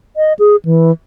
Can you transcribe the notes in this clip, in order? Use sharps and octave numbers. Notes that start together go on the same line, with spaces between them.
D#5
G#4
E3